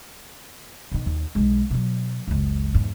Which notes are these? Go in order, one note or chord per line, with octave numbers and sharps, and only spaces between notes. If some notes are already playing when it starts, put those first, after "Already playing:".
B2 D#3
D#2
B1 G#3
B2 F#3
F#1 C#2
E2 G#2